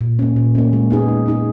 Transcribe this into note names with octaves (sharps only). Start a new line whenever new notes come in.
A#2
A#3 C#4
A#2
A#3 C#4
G#3
B3 D#4 G#4
G#3
B3 D#4 G#4